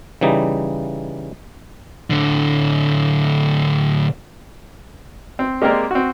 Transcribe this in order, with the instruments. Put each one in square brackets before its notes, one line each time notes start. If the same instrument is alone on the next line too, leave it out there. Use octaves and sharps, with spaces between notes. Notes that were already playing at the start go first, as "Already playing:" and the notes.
[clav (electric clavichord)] C#3 E3 G3 D#4
[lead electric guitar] A2 D3
[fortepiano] C4
G#3 A#3 C4 G4 A#4 D5
C4 F#4